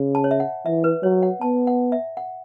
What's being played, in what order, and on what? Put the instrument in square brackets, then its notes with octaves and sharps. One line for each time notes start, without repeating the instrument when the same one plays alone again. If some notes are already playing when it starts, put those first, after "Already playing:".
Already playing: [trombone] C#3
[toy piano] A5
C#5
E5
F#5
[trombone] E3 [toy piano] E5
[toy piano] B4
[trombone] F#3 [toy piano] C#5
[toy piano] F#5
[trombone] B3 [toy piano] A5
[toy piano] F#5
E5
F#5